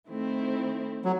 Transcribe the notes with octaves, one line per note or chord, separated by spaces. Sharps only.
D#3 A3 C4 E4
F#3